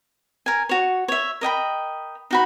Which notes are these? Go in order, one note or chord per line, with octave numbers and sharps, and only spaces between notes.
A#4 G#5
F#4 C#5
C#5 E5
A#4 D#5 G5 B5
D#4 F#4 B5